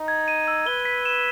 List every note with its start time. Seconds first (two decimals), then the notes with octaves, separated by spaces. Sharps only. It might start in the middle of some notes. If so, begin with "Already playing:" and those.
Already playing: D#4
0.08 G#6
0.28 D#7
0.48 E6
0.67 B4 G7
0.85 B6
1.05 E7